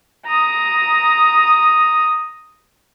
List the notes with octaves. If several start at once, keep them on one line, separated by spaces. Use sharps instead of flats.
A#5 D#6